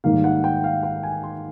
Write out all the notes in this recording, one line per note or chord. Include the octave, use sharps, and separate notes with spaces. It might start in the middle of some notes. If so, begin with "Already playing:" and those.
G#2 D#3 G3 A#3 D#4 F5
F#5
G5
F5
G5
G#5
C6